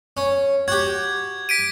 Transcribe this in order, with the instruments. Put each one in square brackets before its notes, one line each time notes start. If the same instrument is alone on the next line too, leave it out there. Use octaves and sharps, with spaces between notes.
[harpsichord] C#4
[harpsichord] F#4 G4 [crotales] G#6
[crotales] B6 D7 D#7